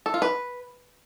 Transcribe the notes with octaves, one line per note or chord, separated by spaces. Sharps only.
A4
F4
B4